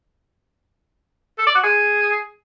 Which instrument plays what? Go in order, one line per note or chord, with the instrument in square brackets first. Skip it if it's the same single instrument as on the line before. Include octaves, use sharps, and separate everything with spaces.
[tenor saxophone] A4
D5
F#4
G#4